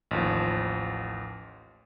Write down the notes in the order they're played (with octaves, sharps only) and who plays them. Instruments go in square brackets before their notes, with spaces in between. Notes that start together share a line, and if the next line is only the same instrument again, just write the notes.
[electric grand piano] A1 D#2 F3